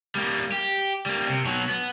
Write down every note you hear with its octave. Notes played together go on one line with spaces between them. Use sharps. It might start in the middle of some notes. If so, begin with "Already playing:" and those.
G3 A#3
G4
G3 A#3
C3
B2 F#3
B3